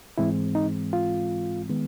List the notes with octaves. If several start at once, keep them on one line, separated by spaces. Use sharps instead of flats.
G#2 E3 G#3 C4 E4
D#4
F4
D#3 G#3 B3